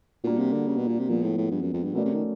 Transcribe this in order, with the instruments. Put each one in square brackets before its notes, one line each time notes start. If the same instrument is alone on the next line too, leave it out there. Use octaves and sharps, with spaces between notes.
[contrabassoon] A#2 [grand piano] G3 A#3 D4 F#4
[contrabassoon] C3
D3
C#3
B2
A#2
C3
[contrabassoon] A#2 [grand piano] F3 G#3 B3
[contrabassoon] A2
A2
G2
F#2
F2
G2
[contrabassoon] B2 [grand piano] A3 C#4 F#4 A#4 D5
[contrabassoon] C3
D#3